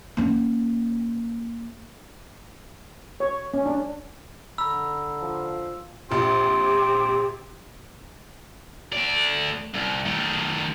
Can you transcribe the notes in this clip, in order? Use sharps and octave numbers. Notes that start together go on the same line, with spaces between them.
A#3 C#4
C#5
C#4
D4
D3 A#5 B5 E6
F3
A#1 F3 C4 G4
A3 D5
C2
D#3 A3